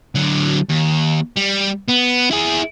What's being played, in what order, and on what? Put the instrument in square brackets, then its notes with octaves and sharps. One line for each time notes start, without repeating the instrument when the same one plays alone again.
[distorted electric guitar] D3 F#3
D#2
G3
B3
E4 G#4